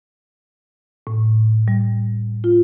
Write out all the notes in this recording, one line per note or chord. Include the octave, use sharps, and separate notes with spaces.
A2
G3
F4